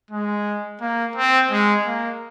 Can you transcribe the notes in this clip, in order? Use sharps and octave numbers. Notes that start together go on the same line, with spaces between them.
G#3
A#3
C4
G#3
A#3